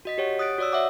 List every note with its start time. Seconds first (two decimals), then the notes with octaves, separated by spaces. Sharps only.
0.05 F#4 D#5 B6
0.18 G4 C#5 F#5
0.38 C#5 D#6 F#6 A6 D7
0.58 F#4 C#5 D5 D#6 E6
0.72 C#5 E5 F#5 D6